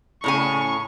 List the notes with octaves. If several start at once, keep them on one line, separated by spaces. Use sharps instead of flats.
A2 C#3 G#5 C#6